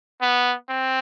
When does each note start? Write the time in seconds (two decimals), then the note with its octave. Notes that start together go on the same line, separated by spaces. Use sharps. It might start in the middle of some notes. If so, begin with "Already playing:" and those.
0.22 B3
0.70 C4